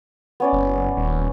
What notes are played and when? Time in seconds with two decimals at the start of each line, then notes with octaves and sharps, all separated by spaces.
0.40 B3 C#4 D5
0.53 F#1
0.97 D#1